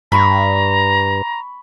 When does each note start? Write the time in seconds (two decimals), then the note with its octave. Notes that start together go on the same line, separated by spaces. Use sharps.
0.12 G2 A#5 B5 C#6